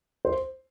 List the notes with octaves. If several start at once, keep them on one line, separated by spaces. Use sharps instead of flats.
C5